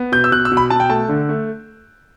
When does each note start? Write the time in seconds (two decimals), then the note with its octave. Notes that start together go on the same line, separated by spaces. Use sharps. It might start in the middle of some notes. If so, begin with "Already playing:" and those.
Already playing: B3
0.12 B2 G6
0.24 E6
0.32 B2 F#6
0.45 E6
0.52 B2
0.57 B5
0.70 B2 A5
0.80 G5
0.89 A3 A5
1.09 D3
1.29 A3